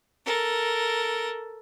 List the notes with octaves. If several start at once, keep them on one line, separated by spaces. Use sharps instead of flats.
A4 A#4